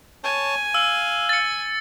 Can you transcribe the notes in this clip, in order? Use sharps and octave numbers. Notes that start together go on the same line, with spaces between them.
C#5 G#5 A5
F5 E6
A6 C#7